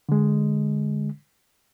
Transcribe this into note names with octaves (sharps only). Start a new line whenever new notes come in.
D3 G#3